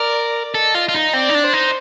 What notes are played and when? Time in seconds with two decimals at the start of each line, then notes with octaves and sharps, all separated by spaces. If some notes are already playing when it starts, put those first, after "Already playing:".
Already playing: A#4 D5
0.54 A4 D#5
0.75 F4
0.89 F4
0.94 D#4
1.13 C4 D5
1.29 D#4
1.35 D4
1.44 C5
1.53 D#4